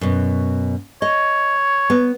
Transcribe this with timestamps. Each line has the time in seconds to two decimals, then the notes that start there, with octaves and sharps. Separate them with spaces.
0.01 F#2 B2
1.02 C#5 D#5
1.90 B3